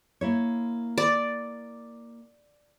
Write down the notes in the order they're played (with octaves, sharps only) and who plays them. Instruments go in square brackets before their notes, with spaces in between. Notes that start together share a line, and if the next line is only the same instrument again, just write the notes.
[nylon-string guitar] A#3 E4 C#5
[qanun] D5